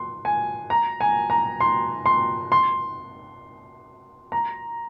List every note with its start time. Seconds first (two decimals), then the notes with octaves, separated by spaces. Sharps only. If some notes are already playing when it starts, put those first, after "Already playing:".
Already playing: C6
0.25 G#5
0.70 A#5
1.01 G#5
1.30 A#5
1.60 C6
2.06 C6
2.52 C6
4.32 A#5